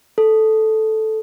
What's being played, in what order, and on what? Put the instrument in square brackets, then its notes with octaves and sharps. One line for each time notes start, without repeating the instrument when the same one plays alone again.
[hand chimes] A4